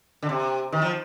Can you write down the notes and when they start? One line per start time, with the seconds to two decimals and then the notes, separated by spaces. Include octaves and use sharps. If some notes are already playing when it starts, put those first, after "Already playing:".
0.23 D3
0.29 C3
0.72 D#3
0.82 F3